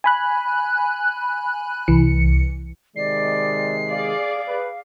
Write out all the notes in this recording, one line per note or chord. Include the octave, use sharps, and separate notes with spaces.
G#5 B5 F#6
C2 E3 C#7
C3 D#3 G#3 D5 C7
G#4 D5 F5
B4